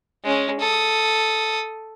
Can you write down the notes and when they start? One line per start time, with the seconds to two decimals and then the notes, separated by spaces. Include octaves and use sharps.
0.24 G#3 C#4
0.60 A4 D#6